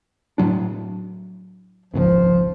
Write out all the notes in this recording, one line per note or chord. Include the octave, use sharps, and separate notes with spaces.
A2 F#3 D4
D#1 G#1 C#2 F3